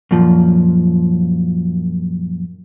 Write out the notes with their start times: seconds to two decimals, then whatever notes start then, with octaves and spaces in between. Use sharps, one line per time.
0.11 F#2 A#2 F3